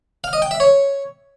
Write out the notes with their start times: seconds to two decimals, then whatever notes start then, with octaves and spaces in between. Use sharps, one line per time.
0.24 F5
0.33 D#5
0.42 G5
0.51 E5
0.60 C#5